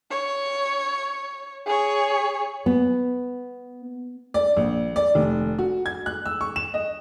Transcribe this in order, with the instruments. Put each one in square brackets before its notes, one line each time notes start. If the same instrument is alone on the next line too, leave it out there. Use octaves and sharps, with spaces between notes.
[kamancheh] C#5
G#4 C#5
[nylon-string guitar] B3
[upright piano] D5
A#1
D5
F1
F#4
G#6
F#6
E6
C#6
E7
D#5